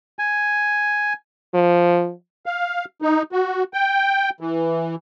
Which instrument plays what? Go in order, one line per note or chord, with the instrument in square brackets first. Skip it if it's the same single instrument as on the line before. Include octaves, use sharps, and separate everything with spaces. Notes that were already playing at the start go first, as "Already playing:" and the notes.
[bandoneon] G#5
[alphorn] F3
[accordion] F5
D#4
F#4
G5
E3